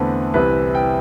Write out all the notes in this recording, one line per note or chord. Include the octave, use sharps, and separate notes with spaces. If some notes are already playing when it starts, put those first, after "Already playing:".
Already playing: E2 D3 A3 C4 B4
C2 C3 E3 B4
G5